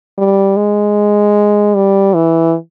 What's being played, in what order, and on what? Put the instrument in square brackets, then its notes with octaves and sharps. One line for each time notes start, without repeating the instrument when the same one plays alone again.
[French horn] G3
G#3
G3
E3